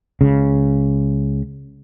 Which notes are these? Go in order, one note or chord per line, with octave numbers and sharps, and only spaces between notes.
C#2 C#3